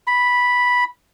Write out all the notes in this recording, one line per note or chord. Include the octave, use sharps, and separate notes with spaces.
B5